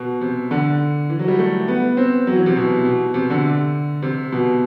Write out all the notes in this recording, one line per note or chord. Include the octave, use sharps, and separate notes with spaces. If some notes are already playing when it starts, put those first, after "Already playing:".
Already playing: B2
C3
D3
E3
F#3
G3
A3
B3
C4
F#3
E3
C3
B2
B2
C3
D3
C3
B2